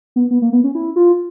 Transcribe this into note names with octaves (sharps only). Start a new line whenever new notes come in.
B3
B3
A#3
B3
C#4
E4
F4